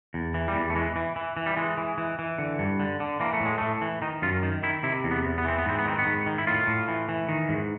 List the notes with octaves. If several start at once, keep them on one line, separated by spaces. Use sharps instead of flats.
E2
E3
G3
E2
A3
E3 G#3
E3
E3
E3
G3
E3 G#3
E3
E3
E3
D3
G2
D3
D3
E3 A#3
A3
A2 G#3
A2 A3
E3
D#3 D#4
F#2 F4
D#3
D#3 E4
C3 E4
E2
B3
E2
B3
E3 C4
B3
G#2 C4
B3
D#3 C4
B3
G#2
D#3
E4
A2 F4
A2
E3
E3
D#3
G#2